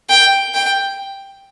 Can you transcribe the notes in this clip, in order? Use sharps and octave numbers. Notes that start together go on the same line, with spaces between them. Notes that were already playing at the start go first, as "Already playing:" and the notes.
G5
G5